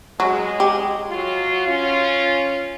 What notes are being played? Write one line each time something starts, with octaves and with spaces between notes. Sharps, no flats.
F#3 G#3
G4
F#3 F4 F#4
C#4 F4